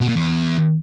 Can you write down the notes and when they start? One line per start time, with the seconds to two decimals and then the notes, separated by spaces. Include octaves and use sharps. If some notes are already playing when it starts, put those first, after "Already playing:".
0.01 B2
0.09 A#2
0.16 E2